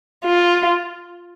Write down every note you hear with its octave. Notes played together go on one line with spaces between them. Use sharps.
F4